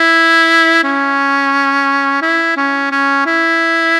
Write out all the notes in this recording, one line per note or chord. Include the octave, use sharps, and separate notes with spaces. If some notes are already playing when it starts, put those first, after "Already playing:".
Already playing: E4
C#4
E4
C#4
C#4
E4